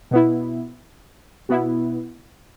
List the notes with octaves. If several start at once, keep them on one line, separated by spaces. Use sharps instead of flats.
B2 B3 E4
B2 B3 E4